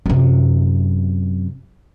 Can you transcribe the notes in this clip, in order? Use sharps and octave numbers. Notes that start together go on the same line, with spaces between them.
F#2 C3